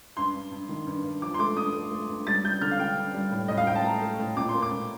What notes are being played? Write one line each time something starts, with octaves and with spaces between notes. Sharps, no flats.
G2 C6
G2
G2
D#3
G2
G2
F3 D6
C6
A3 D6
G2 D#6
A3
A3
G2
G3 A6
G3 G6
D3 F6
F5
D3 G5
G2
G3
A2
A2 D#5
F5
A2 G5
A5
A3 A#5
A3
A2
A#2 D6
C6
A#3
D6
A#2